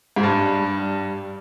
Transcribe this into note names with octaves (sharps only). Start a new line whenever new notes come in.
G#2
G2 G3